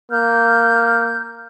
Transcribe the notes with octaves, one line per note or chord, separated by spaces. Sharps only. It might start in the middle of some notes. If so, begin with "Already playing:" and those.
A#3 F6 G6